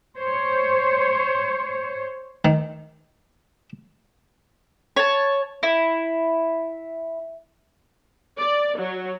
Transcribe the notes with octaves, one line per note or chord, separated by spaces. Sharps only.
C5 C#5
D#3
C#5 A5
E4
D5
F#3